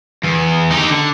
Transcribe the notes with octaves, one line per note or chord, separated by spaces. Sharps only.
E2
D#4 G4
D3